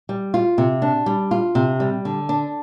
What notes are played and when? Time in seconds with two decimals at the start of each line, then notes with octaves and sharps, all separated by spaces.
0.09 G3
0.34 F4
0.58 C3
0.82 D4
1.06 G3
1.31 F4
1.55 C3
1.80 G3
2.05 D3
2.29 D4